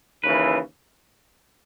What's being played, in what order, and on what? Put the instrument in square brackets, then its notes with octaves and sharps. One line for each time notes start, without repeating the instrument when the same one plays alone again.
[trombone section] D#2 C#3 E3 [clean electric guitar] B4